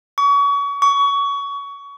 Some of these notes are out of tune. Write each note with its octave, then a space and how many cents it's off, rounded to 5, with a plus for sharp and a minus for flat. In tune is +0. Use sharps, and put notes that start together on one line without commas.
C#6 +35
C#6 +25